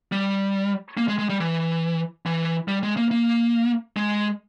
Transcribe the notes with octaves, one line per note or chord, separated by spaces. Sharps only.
G3
A#3
G#3
G#3
G3
E3
E3
G3
G#3
A#3
A#3
G#3